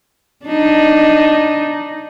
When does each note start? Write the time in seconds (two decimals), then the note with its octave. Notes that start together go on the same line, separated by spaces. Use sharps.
0.45 D4 D#4